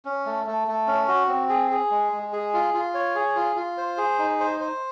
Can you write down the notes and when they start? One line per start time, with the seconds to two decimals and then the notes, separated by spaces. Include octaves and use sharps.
0.05 C#4
0.26 A3
0.47 A3
0.67 A3
0.87 C#4
1.08 F#4
1.28 C4
1.49 G#4
1.71 G#4
1.91 G#3
2.12 G#3
2.33 G#4
2.54 F4
2.74 F4
2.94 C#5
3.15 G#4
3.36 F4
3.56 F4
3.78 C5
3.97 G#4
4.19 D#4
4.40 C5
4.60 C5